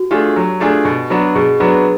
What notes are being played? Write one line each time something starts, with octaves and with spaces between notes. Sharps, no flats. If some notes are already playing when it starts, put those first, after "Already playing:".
Already playing: F#4
A3 D4 F4 G4 G#4
F#3
A3 D4 F4 G#4
B2
F#3 B3 D4 F#4
B2 G#4
F#3 B3 D4 F#4 B4